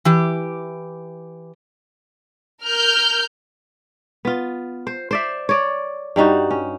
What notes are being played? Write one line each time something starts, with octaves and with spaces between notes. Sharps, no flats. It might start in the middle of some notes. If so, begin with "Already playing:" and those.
E3 G4
A#4 F6 G6
B3 F4
C5
C5 D5 E5
C#5 D5
G2 G3 D#4 F#4
C#4